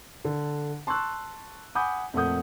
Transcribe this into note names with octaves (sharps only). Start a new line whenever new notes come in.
D3
A5 C6 C#6 E6 F#6
F#5 G#5 B5 D6 D#6 G6
F2 A#2 A3 F#5 D#6 G6